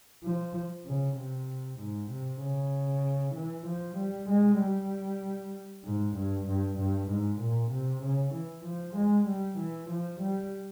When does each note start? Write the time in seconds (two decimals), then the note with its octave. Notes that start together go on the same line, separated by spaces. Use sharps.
0.24 F3
0.86 C#3
1.17 C3
1.80 G#2
2.11 C3
2.42 C#3
3.35 E3
3.67 F3
3.97 G3
4.29 G#3
4.60 G3
5.84 G#2
6.16 G2
6.47 G2
6.78 G2
7.09 G#2
7.40 A#2
7.71 C3
8.03 C#3
8.34 E3
8.65 F3
8.96 G#3
9.28 G3
9.59 E3
9.90 F3
10.21 G3